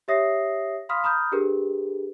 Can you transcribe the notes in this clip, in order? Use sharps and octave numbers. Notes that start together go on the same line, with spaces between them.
G4 C#5 E5 D#6 A#6 C7
F5 B5 C6 D#6 F6 B6
A#5 B5 D#6 F6 G6
D4 G4 G#4 A#4 B4